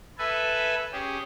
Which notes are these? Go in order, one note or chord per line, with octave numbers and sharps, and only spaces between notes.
A4 B4 E5 G#5
C#4 G4 G#4